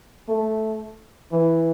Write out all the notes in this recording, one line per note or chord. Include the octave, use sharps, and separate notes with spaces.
A3
E3